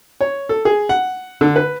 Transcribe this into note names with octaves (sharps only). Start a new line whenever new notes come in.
C#5
A4
G#4
F#5
D3
B4